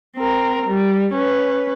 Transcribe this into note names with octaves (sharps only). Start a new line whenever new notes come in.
C4 A#4
G3
C#4 B4